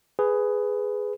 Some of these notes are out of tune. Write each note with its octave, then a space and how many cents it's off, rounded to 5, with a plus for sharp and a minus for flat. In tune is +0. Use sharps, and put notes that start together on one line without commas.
G#4 +0 B4 +15